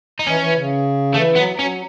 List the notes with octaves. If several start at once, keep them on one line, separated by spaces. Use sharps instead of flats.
D#4
E3 C#4
E3
C#3
E3 A3
F#3 B3
F#3 C#4